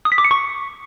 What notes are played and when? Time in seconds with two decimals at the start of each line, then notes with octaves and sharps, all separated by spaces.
0.05 D#6
0.12 B6
0.18 D6
0.24 C#7
0.31 C#6